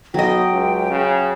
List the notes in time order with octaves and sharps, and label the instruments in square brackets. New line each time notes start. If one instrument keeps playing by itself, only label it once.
[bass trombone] B1 [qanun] F#3 D#5 [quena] G5
[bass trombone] C#2
C#3